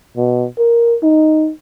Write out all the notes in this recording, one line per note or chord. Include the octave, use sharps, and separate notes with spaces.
B2
A#4
D#4